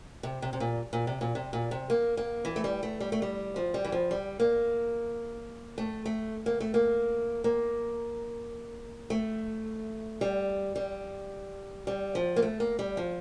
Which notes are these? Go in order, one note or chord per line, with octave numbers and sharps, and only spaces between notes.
C3
C3
C3
A#2
A#2
C3
A#2
C3
A#2
C3
A#3
A#3
E3
A3
G3
A3
G3
A3
G3
F3
G3
E3
F3
G3
A#3
A3
A3
A#3
A3
A#3
A#3
A3
G3
G3
G3
F3
A#3
A3
A#3
G3
F3